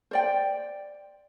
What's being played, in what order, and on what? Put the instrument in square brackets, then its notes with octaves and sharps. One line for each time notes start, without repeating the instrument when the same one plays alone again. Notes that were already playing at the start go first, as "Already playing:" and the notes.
[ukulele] C5 D5 G5